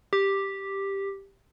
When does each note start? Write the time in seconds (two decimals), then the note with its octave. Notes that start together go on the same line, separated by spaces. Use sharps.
0.13 G4